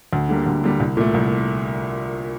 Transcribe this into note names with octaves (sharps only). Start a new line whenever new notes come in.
D2
D3 G3 A#3
D2
D3 G3 A#3
C2
A#2 A3
C2